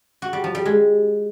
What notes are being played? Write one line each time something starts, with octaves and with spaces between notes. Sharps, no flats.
F#4
G3
F3
G3
G#3